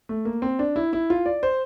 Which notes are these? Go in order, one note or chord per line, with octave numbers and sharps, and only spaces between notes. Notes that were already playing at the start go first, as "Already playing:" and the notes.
A3
A#3
C4
D4
E4
E4
F4
D5
C5